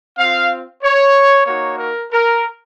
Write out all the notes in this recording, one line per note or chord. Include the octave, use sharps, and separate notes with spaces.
C4 F4 F5
C#5
A#3 D#4 F#4 C#5
A#4
A#4